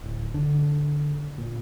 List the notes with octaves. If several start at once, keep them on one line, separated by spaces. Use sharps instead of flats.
D1
D3
A#2